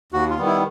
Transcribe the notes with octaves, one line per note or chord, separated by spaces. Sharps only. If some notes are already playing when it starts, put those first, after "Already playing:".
D#2 F#4
F4
D#3 G3 B3
E4